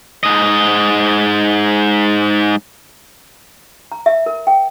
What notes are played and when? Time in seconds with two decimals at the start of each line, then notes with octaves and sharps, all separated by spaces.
0.24 G#2 D#5
3.92 A#5
4.06 E5
4.26 A#4
4.47 G5